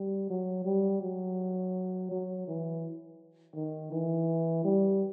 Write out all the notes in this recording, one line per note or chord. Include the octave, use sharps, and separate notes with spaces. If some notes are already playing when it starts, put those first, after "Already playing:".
Already playing: G3
F#3
G3
F#3
F#3
E3
D#3
E3
G3